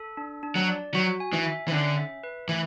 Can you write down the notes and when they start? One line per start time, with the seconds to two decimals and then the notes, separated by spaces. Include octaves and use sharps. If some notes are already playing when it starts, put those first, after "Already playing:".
Already playing: A4
0.17 D4
0.43 D4
0.55 F#3
0.69 D5
0.94 F#3 F#4
1.20 G#5
1.33 E3
1.46 E5
1.68 E3
1.72 D3 C#4
1.97 E5
2.24 B4
2.49 E3 A3